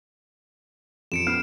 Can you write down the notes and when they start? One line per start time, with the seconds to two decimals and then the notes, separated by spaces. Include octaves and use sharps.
1.12 F2 C#7 D7 E7
1.27 B3 F6 C7